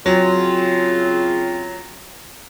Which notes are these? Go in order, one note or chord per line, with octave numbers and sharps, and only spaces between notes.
C#3 F#3 C4 F4